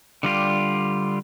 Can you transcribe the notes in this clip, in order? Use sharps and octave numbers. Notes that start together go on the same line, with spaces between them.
D3 G3 F4 G4